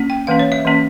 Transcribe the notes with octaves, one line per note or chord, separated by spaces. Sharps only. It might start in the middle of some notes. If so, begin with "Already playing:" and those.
Already playing: A#3 C#4
G5
E3 A#3 C#4 F5
C#5
E5
E3 A#3 C#4